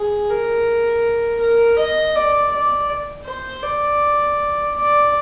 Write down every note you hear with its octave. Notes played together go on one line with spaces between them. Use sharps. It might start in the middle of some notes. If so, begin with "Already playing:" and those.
Already playing: G#4
A#4
A#4
D#5
D5
D5
C5
D5
D5